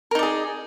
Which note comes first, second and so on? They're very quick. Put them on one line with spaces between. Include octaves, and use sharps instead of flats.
A#4 D#4 D5 G#4